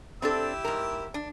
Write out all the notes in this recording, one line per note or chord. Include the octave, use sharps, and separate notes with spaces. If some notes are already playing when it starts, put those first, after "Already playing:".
C4 D4 E4 G4 A4 E6
G#2 A#4
D4